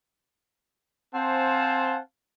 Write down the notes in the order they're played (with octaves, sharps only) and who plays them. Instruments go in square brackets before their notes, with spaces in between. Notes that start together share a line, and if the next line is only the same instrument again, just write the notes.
[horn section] C4 C5 F5 F#5 G#5 A5